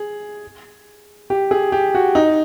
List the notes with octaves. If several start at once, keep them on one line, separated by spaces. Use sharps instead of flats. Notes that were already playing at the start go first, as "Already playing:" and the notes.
Already playing: G#4
G4
G#4
G4
F#4
D#4